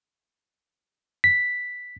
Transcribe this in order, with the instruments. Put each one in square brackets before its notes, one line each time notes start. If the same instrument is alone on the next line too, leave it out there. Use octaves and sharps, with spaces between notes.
[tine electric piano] B6